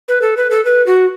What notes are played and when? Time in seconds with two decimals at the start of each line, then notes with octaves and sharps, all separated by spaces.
0.08 B4
0.22 A4
0.37 B4
0.51 A4
0.65 B4
0.87 F#4